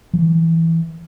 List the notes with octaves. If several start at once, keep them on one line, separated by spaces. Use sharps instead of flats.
F3
E3